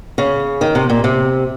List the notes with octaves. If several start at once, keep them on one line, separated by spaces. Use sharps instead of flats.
C#3
D#3
C3
A#2
C3